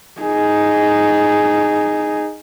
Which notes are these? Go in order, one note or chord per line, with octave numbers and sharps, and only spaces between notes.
D#4 G#4